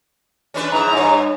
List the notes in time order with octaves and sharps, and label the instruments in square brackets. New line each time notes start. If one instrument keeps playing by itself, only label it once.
[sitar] C#4 D4 B4
[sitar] G#2 E4 [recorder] A#5
[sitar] G2 C#5